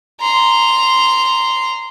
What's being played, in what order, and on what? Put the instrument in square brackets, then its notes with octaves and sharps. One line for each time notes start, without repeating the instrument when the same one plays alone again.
[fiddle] A#5 C6